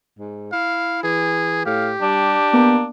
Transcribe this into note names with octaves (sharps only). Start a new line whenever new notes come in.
G#2
E4 F5
E3 G#4
A2 G4 F5
G3 D4
A#3 B3